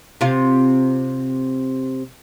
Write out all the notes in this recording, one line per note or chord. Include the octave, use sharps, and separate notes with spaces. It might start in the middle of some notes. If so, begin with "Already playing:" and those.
C3 C4 F4